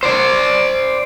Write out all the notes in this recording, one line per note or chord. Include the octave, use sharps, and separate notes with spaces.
C5 D5